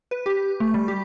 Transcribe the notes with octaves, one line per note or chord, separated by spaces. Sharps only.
B4
G4
A3
G3
G4